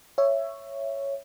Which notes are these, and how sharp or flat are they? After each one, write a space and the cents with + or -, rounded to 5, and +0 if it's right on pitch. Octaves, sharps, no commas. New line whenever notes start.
C#5 +0 E5 +15